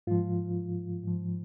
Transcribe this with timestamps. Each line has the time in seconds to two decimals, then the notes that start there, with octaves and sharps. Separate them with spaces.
0.07 G#2 F3 F4
1.03 G#2 F3